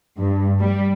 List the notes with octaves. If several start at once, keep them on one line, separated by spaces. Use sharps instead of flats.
G2
G3